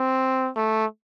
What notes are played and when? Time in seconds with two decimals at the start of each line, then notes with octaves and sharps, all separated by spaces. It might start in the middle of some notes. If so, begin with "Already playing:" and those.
Already playing: C4
0.56 A3